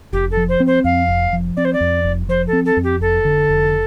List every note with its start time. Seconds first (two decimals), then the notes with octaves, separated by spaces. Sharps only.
0.12 F1 G4
0.31 A4
0.37 F3
0.49 C5
0.60 C4
0.66 C5
0.84 F2 F5
1.08 F1
1.33 F3
1.56 C4 D5
1.65 C5
1.73 D5
1.81 F2
2.04 F1
2.28 F3 C5
2.47 A4
2.53 C4
2.65 A4
2.77 F2
2.83 G4
3.01 F1 A4
3.25 D3
3.49 F1